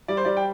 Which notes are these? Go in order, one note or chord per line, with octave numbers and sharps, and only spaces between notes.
G3 D5
C5
G3 D5
G5